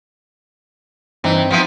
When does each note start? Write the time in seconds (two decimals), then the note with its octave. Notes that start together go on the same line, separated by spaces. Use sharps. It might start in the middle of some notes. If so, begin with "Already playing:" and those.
1.24 G2 E3 C4 D#4
1.51 F3 B3 E4